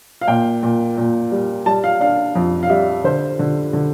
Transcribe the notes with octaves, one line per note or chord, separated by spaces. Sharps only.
F5
A#2 G5
A#2
A#2
G3
G3 A5
F5
D4 F5
F2
F5
G3 E5
D3 C5
D3
D3